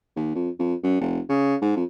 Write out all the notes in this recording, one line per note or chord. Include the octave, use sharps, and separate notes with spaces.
D#2
F2
F2
F#2
F1
C#3
G#2
F2